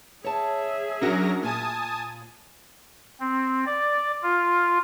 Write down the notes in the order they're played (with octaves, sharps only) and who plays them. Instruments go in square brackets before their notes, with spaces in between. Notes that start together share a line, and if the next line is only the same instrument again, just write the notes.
[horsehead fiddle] G#4 E5 [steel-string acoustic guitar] C#5 A5
[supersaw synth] F#3 A#4 A#6 [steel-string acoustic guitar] C#4 D4 F#4
[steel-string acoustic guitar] A#2 [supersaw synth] G#5 A5 D#6
[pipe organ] C4
D5
F4